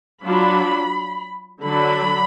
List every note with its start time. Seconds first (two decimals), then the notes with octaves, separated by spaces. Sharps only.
0.24 F#3 D4 F4 B5
1.63 D3 F#3 D4 B5